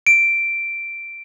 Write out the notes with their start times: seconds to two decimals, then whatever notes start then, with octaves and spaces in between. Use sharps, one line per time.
0.07 D7